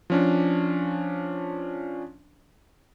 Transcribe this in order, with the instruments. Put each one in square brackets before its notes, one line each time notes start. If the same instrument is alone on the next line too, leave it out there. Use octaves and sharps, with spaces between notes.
[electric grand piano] F3 C#4 D4